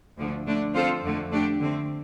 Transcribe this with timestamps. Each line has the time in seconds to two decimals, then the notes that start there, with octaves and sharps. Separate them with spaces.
0.17 D2 D3 F3 A3
0.46 D3 A3 D4
0.75 F3 C4 F4 A4 C5
1.04 F2 D3 A3
1.31 D3 A3 D4 G4
1.60 D3 A3 C4